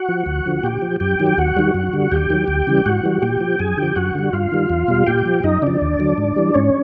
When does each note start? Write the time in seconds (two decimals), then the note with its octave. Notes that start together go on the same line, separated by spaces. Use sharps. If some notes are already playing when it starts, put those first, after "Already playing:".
Already playing: F#4 F#5
0.09 F3
0.26 D2
0.46 D3 F3
0.63 A#2 G4 G5
0.82 F3
1.00 F#2 G4 G5
1.19 D#3 F#3
1.38 D#2 F#4 F#5
1.56 D#3 G3
1.74 F#2
1.93 D3 G3
2.12 D#2 G4 G5
2.30 D#3 F#3
2.48 D2
2.67 C#3 E3 G3
2.86 G#2 F#4 F#5
3.03 E3 G3
3.22 A#2 G4 G5
3.41 F3
3.59 F#2 G#4 G#5
3.77 D3 F3 G4 G5
3.96 F#2 F#4 F#5
4.15 D3 G3
4.33 G2 F4 F5
4.52 D#3 G3
4.70 E2
4.88 B2 G3
5.07 A#2 G4 G5
5.26 F3
5.43 F#2 D#4 D#5
5.62 C#3 F3 D4 D5
5.81 D#2
5.99 D3 F#3
6.18 G#2
6.36 E3 G3
6.54 G#2 C#4 C#5